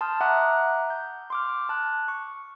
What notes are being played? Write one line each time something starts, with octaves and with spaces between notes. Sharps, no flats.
A5 C6 D#6 F6 G6
E5 F#5 A#5 D6 D#6 F#6
G6
C6 D6 F6
A5 F#6
C#6